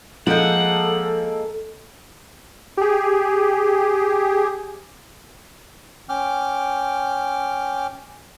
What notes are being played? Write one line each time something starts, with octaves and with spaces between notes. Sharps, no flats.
F3 G#3 A#3 A4 F#5 G6
G4 G#4
C#4 G5 D6 F6